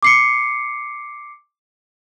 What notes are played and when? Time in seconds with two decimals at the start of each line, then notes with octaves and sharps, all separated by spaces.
0.03 D6 C7 C#7